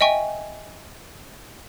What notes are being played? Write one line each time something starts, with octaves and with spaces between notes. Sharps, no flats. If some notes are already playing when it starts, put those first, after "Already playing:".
D#5 E5 G5 G#5 C#6